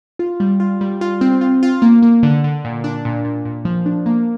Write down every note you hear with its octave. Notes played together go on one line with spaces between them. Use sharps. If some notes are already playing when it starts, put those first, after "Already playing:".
F4
G3
F4
G3
F4
C4
F4
F4
A#3
A#3
D3
D3
A#2
D4
A#2
A#2
A#2
F3
D4
A#3